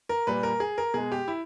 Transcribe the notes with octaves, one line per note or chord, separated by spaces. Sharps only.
A#4
A#2 G3 B4
A#4
G#4
A#4
B2 G#3 G#4
G4
E4